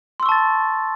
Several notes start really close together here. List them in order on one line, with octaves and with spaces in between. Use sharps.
C6 E6 C#6 A5 A6